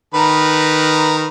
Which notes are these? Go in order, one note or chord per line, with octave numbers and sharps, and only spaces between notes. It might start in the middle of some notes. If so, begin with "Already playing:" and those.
D#3 B4 A#5